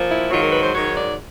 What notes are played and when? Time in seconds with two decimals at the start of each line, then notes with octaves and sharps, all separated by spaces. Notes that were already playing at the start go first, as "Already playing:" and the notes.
Already playing: A#2 F3
0.10 E4
0.30 G#2 D#3 F#3 F4
0.42 A#4
0.52 B4
0.63 C5
0.73 G#2 D#3 F#3 C#5
0.96 D5